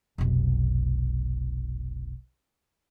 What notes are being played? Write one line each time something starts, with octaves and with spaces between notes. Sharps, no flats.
F1 B1